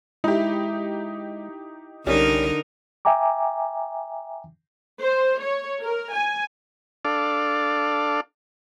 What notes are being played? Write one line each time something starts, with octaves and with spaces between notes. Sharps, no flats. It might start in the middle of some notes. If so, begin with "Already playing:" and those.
G#3 D#4 E4 G4
C2 D3 G3 C#4 D#4 A#4
E5 G5 G#5 A#5 D6
C5
C#5
A#4
G#5
D4 A4 D5 F5